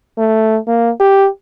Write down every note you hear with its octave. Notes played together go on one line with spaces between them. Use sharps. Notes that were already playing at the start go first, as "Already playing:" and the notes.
A3
A#3
G4